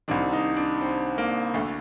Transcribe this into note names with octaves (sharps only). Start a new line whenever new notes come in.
C2 C3 D#3 D4
D#4
D4
C4
A#3
D2 D3 A3